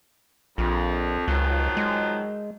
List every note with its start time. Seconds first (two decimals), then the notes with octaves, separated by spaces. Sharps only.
0.58 A#1 F2
1.28 C#2 D#3 F3 F#3
1.77 G#3